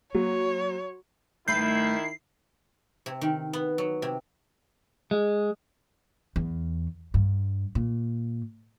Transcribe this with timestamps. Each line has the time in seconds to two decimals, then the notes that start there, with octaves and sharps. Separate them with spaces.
0.15 F#3 A#3 F#4 C#5
1.48 G2 D#3 A3 E4 B4 G6 C7
3.06 C3
3.21 D#3
3.53 B3
3.78 F#3
4.02 C3
5.11 G#3
6.36 E2
7.14 G2
7.75 A#2